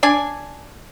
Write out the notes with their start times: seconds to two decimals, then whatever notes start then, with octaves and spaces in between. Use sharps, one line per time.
0.03 D4 D5 G#5